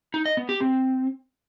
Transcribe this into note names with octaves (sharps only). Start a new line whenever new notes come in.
D#4
D#5
B3
G4
C4